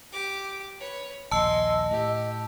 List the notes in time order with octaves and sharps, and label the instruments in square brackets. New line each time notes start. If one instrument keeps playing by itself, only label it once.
[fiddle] G4 D6
B4 C#5
[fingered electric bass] A#1 D#2 [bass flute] D#5 [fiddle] G#5 C6 [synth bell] A5 E6
[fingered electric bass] A2 [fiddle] G4